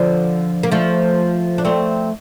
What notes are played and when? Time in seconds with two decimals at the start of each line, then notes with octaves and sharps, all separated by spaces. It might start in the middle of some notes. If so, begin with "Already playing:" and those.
Already playing: D3 F3
0.63 A#3
0.71 F3 A3
1.58 D4
1.65 A3 C4